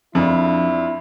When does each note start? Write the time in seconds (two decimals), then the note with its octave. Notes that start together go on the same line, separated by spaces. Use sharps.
0.15 F2 F3 D4 E4 D5